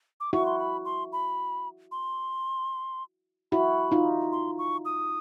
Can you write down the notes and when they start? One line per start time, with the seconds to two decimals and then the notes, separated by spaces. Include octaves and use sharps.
0.20 D6
0.33 E4 F#4 C#6
0.46 C6
0.59 B5
0.85 C6
1.13 B5
1.92 C6
3.52 E4 F#4 B5
3.92 D#4 F4
4.32 C6
4.58 C#6
4.85 D#6